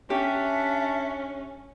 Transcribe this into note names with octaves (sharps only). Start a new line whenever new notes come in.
C#4 D4 G4 E5